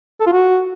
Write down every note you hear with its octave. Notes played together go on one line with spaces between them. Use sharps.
A4
F4
F#4